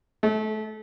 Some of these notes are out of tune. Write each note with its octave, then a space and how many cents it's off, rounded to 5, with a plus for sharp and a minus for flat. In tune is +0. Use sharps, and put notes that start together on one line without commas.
A3 -30